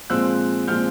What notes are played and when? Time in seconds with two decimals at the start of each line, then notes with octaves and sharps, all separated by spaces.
0.10 A#2 F3 G#3 C4 E6 F#6
0.68 A#2 F3 G#3 C4 F6 G6